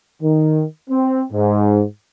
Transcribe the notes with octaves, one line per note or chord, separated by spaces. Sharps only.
D#3
C4
G#2